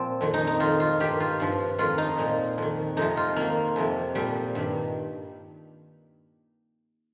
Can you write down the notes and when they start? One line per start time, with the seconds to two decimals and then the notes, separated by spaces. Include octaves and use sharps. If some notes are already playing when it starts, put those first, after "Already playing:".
Already playing: A#2 F3 C4
0.21 F2 D#3
0.34 D#4
0.47 D#4
0.60 F2 D#3 F4
0.80 F4
1.00 G2 D#3 G4
1.20 F4
1.40 G2 F3
1.79 F2 D#3 F4
1.98 D#4
2.18 A#2 F3
2.58 F2 D#3
2.97 F2 C3 F3 D#4
3.17 F4
3.36 F2 D#3 A#3
3.76 F2 C3 F3
4.15 A#2 F3 G3
4.55 G2 D#3